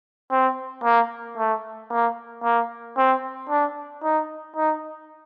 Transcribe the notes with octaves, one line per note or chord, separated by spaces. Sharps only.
C4
A#3
A3
A#3
A#3
C4
D4
D#4
D#4